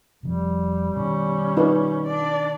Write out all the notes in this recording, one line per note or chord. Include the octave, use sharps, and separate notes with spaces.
F1 C3 F3 G3
B2 D#3 C#4
D#4 F4 B4
D4 D5